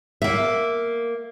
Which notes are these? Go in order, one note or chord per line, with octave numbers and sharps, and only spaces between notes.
A#3 E5